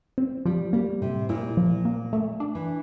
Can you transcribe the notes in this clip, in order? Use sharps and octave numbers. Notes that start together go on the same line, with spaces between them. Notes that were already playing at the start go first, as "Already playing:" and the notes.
C4
F3 G3
G3 A#3
A2 C3
A#2 E4
F3
A#3
A3
D4
E3